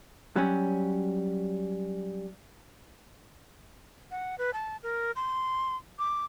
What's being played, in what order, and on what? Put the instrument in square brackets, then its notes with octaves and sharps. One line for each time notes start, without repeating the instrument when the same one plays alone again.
[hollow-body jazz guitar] F#3 G3 C#4
[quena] F#5
B4
A5
A#4
C6
D6